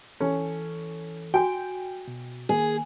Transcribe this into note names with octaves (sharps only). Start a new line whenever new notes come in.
E3 C#4 A4
F#4 G5 G#5
B2
D#3 A#3 G#4